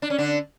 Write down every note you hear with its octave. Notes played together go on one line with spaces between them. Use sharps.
D4
C#4
D3 D4